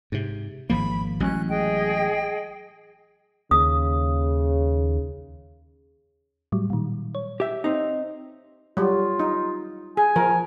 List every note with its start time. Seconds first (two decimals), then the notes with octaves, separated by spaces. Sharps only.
0.12 G#2 C3
0.70 G#1 F3 A#3 B5
1.20 A1 F#3 G#3 C#4 F#6
1.48 G#4 D#5 G5
3.51 D#2 C#3 D#6
6.52 A2 F#3 G3
6.70 A#2 D#3
7.15 C#5
7.40 G4 E5
7.64 C4 D#4
8.77 F#3 G3 F4
9.20 D#4
9.97 G#4 G#5
10.16 F3 A#4